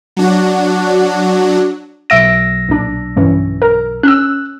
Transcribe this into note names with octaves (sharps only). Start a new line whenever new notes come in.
F#3 D4 F#4
B1 E5 E6 A#6 D7
A#1 D4
G2 E3 C#4
A#4
C#4 E6 F#6